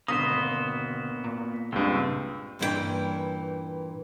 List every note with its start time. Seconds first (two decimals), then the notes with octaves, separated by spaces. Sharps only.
0.08 G#1 B2 D3 A#3 B3 C5 D#6
1.24 A#2
1.72 C#2 G2 C4
2.59 G2 A#2 E3 C#4 F#4 G5